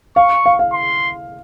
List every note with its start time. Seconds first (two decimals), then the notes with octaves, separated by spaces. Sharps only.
0.16 F5 C#6
0.46 F5
0.59 F5
0.73 C6